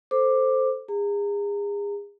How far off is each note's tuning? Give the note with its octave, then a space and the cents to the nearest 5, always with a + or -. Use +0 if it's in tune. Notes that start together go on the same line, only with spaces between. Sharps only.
A4 +0 C5 +0 D6 +5
G#4 -35 A#5 -30